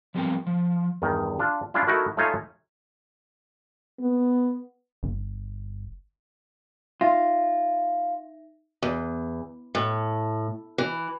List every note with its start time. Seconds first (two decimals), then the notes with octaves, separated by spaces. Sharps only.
0.15 F3 G3 B3 C4 A#4 G5
0.47 F3
1.02 E2 G2 D#3
1.39 D4 F4
1.74 C#4 D4 E4 F4
1.87 A3 D#4 E4 F#4 A#4
2.17 A3 D#4 F4 C#5 E5 G#5
4.00 B3
5.03 G1
7.01 D#4 F4 E5 A#6
8.82 E2
9.75 A2
10.78 E3